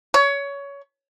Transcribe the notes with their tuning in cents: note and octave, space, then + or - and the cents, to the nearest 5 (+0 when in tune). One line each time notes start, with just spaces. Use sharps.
C#5 +20